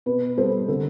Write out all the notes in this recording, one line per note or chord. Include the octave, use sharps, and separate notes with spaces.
B2 B4
G3 B3 A4 C5
D3 A4